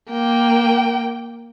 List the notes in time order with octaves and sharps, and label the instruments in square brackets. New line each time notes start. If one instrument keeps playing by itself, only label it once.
[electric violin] A#3 G5